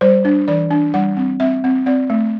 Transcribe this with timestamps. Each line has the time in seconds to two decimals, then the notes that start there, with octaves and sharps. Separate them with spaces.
0.01 G3 C5
0.25 D4
0.48 E3 D5
0.71 D4
0.94 G3 F#5
1.17 C4
1.40 C4 E5
1.64 C4
1.86 C4 D5
2.10 A3